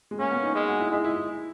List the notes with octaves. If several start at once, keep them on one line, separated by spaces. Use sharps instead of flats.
G#3
A#3 C#4
B3
D#4
G#3
F#4
E4
G#3 E4
E4
E4